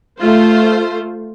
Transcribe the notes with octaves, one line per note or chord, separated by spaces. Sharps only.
A3 F4 C5